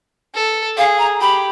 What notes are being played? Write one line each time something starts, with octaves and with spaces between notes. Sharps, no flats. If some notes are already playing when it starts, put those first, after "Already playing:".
A4
G#4 F5
A#5
G4 B5